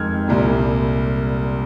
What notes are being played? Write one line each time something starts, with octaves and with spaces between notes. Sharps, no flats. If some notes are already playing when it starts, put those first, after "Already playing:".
Already playing: F2 D#3 G#3 F6 G#6
C2 A#2 G3